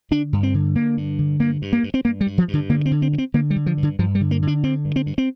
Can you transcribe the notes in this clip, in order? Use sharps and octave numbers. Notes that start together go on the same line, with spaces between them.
D3 D4
G2
C4
D3
D3 A#3
G2
D3
G2 A#3
G2
A#3
G2
C4
G2 A#3
G3
G2
F3
G2
D3
D3 A#3
C4
D3
C4
G2
C4
D3 A#3
G3
D3
F3
G2
D3
G2 F3
G3
D3
A#3
D3
D4
D3 C4
G2
C4
G2
C4